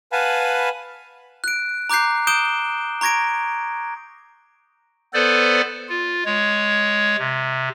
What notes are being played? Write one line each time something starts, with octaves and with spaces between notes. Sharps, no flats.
B4 F5 F#5 G#5 A5 B5
F#6 D7
A#5 D6 F#6 G6 C7
D#6 G6 D7 E7 G7
A#5 C#6 G#6 A#6 D7
B3 A4 B4 C5 D5
F4
G#3 C#5
C3